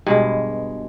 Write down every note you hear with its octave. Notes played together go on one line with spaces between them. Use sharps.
G2 B2 G#3